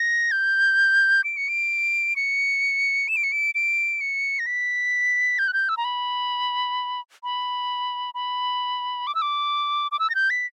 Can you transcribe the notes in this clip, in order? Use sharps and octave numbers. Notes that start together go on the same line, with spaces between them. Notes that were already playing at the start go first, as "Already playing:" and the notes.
Already playing: A#6
G6
D7
C#7
D7
C#7
E7
D7
C#7
D7
D7
C#7
A#6
B6
G6
F#6
G6
E6
A#5
B5
B5
B5
D6
E6
D6
D6
E6
A#6
G6
B6